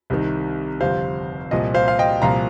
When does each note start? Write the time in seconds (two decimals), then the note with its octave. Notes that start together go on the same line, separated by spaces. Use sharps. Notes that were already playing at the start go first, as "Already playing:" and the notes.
0.10 C2 C3 D#3
0.81 G1 F2 C3 C5 F5
1.51 C2 A#2 F3 D#5
1.74 C5 F5
1.88 F5
1.99 D#5 G5
2.22 C2 A#2 F3 F5 A#5